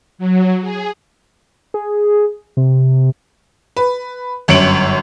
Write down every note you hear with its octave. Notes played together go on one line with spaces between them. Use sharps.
F#3
G#4
G#4
C3
B4
G1 F#2 C#5 C#7 D7 F#7